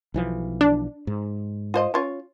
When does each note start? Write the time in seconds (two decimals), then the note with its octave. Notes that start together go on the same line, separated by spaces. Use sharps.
0.14 B1 E3 F3
0.61 D4
1.07 G#2
1.74 F4 C5 D#5
1.94 C#4 F4 C#5